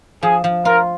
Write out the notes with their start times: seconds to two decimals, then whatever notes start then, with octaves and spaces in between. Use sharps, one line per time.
0.23 F3 G#4
0.44 F3
0.65 F4 A#4